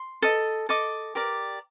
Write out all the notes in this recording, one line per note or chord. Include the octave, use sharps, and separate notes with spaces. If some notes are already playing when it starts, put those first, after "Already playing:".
Already playing: C6
A4 D#5
A4 D#5 D6
G4 A#4 D5